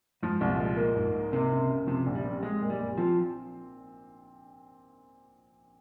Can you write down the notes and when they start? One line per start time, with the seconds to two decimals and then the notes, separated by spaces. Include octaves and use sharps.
0.23 G#2 F3
0.41 C2
0.50 A#2
0.59 G#3
0.77 A#3
0.96 G#2
1.15 D#4
1.33 C3 A#3
1.51 C#3
1.70 C#3
1.87 C3 F3
2.06 A#1
2.15 G3
2.25 C4
2.43 G#3 C4
2.61 A#2
2.70 G3
2.79 A#2
2.98 F3 C4